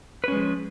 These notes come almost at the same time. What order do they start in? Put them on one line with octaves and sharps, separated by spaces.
B4 C#4 G#3 F3